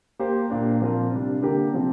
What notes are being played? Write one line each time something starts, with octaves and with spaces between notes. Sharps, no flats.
A#3 G4 C5
A#2 A#3 D4
A#2 F3 C4 F4 A#4
C3 G3 D4
D3 A#3 G4 A#4
C3 F3 C4